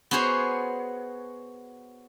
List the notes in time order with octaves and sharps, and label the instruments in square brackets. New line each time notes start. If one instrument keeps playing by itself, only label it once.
[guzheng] B3 F#4 G#4 C5 C#5